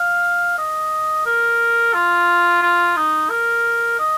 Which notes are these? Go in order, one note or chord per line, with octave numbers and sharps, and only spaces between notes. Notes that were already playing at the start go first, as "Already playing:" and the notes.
Already playing: F5
D#5
A#4
F4
F4
D#4
A#4
D#5